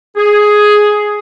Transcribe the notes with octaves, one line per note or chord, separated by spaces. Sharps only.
G#4